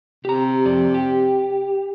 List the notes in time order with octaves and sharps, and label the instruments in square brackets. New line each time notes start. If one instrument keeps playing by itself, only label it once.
[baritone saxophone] C3 [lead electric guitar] G4 A#5
[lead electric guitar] F2 D5
G4